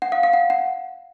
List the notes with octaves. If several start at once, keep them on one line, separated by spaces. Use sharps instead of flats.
F#5
F5
F5
F#5
F#5